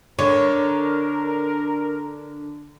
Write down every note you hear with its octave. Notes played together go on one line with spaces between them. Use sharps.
D3 A#4 C#5